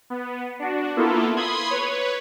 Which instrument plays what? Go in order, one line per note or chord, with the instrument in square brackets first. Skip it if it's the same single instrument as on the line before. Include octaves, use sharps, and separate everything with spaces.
[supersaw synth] B3
D4 F#4
A#3 B3 E4 F4 A4
B5 C6 D#6 G#6
B4 C#5